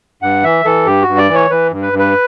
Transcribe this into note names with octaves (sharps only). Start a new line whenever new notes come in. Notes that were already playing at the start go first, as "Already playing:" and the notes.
G2 F#5
E3 E5
E3 A4
G2 G4
F#4
G2
D5
E3
C#5
E3 B4
G2
B4
G2
B4